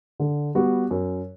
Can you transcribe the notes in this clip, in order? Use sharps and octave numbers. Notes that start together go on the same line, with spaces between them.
D3
G3 B3 F#4
F#2